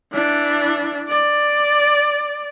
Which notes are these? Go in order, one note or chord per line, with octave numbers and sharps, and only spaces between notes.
E3 D4
D5